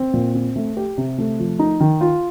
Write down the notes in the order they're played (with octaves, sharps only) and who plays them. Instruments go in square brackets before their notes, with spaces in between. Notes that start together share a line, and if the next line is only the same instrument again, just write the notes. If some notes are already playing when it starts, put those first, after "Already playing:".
Already playing: [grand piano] C4
A#2
C4
A3
G4
C3
A3
F3
D#4
D#3
F4